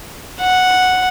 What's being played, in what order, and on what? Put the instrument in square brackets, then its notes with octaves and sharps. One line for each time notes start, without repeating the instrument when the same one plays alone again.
[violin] F#5